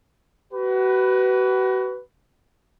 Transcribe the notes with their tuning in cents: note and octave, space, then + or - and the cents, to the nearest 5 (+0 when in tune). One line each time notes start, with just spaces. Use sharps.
F#4 +35 B4 +5